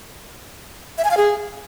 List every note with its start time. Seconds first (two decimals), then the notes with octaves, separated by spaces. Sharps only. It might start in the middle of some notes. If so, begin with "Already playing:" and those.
0.98 E5
1.04 G#5
1.11 F5
1.17 G#4